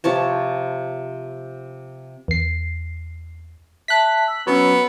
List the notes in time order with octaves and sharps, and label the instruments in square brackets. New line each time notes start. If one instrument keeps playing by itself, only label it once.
[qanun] C3 F3 C#5 A5
[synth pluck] E2 C7
[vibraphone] E5 A5 [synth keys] F#6 B6
[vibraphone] E6
[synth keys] F#3 C#4 [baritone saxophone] B3